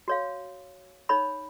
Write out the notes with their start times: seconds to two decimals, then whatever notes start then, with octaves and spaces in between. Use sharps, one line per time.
0.08 F#4 C#5 F5
1.09 D#4 C#5 B5